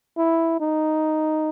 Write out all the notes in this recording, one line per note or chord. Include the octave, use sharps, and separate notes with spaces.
E4
D#4